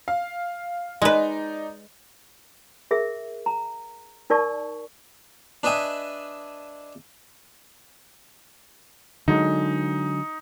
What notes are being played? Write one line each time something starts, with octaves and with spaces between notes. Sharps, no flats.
F5
G#3 D#4 B4 D5
G#4 A#4 E5
A#5
D#4 A#4 D5 A5 C#6
D4 B4 D#5 E5 G#5
D3 F#3 G#3 D#4